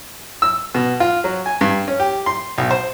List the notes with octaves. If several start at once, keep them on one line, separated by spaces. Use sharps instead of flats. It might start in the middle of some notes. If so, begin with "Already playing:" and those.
E6
B2
F4
F#3
G#5
G2
C#4
G4
C6
B1
C5